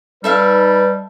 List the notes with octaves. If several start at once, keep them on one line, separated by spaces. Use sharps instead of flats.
G3 D#4 A4 B4 E5 F5